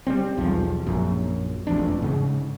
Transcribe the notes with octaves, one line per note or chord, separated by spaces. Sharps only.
G3 A#3 C4
B1 E2 F3
A#1 F#2
E1 A1 F2 D4
G#2 C#3